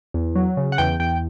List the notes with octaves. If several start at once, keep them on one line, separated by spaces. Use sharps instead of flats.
E2
F#3
C#3
F#5
E2 G5
E2 G5